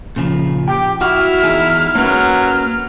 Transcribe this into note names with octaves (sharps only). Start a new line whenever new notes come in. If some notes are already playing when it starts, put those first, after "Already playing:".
A#2 C#3 F3
G4 G5
E4 F#4 F#5 F6
E2 D#4 G#4
F#3 A#3 C#4 B4